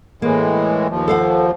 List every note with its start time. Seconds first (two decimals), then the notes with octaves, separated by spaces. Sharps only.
0.22 A2 E3 G#3 A#3
0.90 D#2 F3
1.08 A4 F5 F#5